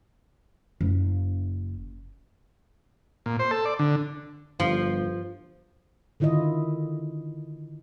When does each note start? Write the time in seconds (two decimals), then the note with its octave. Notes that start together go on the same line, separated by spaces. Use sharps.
0.81 F#1
3.26 A#2
3.39 C5
3.51 A4
3.65 D5
3.79 D3
4.60 G1 G2 F3
6.20 D3 D#3 E4 F4 D#5